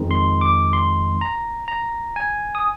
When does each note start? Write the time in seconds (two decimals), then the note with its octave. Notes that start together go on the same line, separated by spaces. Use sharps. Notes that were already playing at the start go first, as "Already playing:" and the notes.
Already playing: F2 D#3 G#3 C4 D#4
0.11 C6
0.41 D6
0.73 C6
1.21 A#5
1.68 A#5
2.16 G#5
2.55 D#6